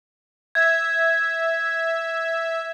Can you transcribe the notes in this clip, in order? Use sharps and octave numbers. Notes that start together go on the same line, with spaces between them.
E5 G#6